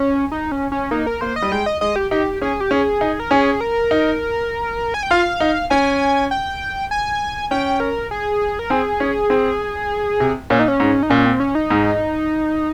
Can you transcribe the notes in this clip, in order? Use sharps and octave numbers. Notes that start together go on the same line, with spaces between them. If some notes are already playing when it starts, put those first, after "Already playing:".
Already playing: C#4
D#4
C#4
C#4
A#3 D#4
A#4
A#3 C5
D#5
G3
G#3 G5
D#5
G#3 D#5
G4
D#4 G4
C#4 G#4
G4
C#4 G#4
D#4
A#4
C#4 G#4
A#4
D#4
G#5
G5
F4 F5
D#4
C#4 G#5
G5
G#5
C#4 G5
A#4
G#4
A#4
C4 G#4
C#4
C4
C3
A#2 C#4
D#4
C#4
G#2
D#4
A#2 C#4
C4
C#4
D#4
G#2